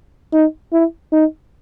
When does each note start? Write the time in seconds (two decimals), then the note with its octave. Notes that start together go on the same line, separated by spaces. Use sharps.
0.33 D#4
0.73 E4
1.12 D#4